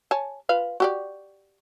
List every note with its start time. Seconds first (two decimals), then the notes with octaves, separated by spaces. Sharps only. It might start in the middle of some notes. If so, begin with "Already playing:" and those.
0.11 C#5 G#5 A5
0.49 F4 B4 F5
0.80 F#4 G4 D5